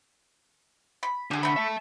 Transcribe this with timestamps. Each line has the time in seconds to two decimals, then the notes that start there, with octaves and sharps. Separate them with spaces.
1.03 B5
1.31 D3 G4 G#4
1.43 A3 B5
1.56 E5 A5